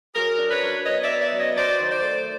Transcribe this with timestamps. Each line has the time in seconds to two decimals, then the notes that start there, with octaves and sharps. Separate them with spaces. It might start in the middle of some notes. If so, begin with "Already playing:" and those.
0.15 F#3 G#4 A#4
0.38 D4
0.50 B4 C#5
0.62 F#3
0.85 B3 C#5 D#5
1.03 D5 E5
1.09 B3
1.21 D5 E5
1.32 F#3
1.38 C#5 D#5
1.56 F#3 C5 D5
1.79 D#3
1.91 C5 D5
2.03 A3